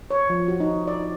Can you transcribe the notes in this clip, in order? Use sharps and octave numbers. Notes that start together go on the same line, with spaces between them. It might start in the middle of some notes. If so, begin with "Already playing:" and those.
C#5
F3
F#4
D#4
D5